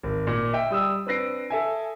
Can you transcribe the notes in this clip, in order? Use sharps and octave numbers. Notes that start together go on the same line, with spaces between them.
G#1
A#2
D#5 E5 G5
G3 D#6 E6
C4 D4 B4 A#6 C7 D7
A4 E5 G#5